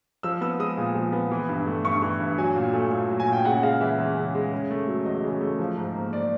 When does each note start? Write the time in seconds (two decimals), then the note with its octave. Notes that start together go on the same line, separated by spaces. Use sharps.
0.23 F3 E6
0.41 B3 E6
0.59 G#3 D#6
0.77 A#2
0.95 F3
1.12 B3
1.31 E3
1.49 G2
1.66 A3
1.84 G2 C#6
2.02 E3
2.20 G2
2.38 F#3 G#5
2.56 A#2
2.73 A3
2.91 A#2
3.10 F#3
3.20 G#5
3.27 A#2
3.33 G5
3.45 C#3 F#5
3.63 G#3 F5
3.80 E3 E5
3.98 E2
4.16 C#3
4.35 G#3
4.52 C#3
4.70 A3
4.88 F#3
5.05 E2 D#5
5.24 C#3
5.41 A3
5.60 F3
5.77 G#2
5.95 A#3
6.13 D5